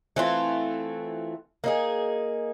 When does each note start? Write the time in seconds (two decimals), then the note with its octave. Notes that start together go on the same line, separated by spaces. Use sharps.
0.16 E3 A3 C4 F4
1.64 A#3 D#4 G#4